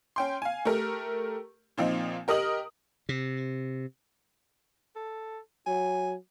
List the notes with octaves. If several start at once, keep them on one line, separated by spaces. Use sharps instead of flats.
C#4 G5 C6
F5 G#5
A3 G4 A#4
A#2 F3 C4 D#4
G4 A#4 D#5 D#6 F#7
C3
A4
F#3 G#5